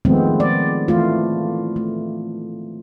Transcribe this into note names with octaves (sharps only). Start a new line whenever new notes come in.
D#3 F3 G#3 A3 B3 C4
D5
E3 A3 F4
A3